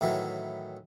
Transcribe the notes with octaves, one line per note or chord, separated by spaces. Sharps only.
A2 D#3 E3 F#3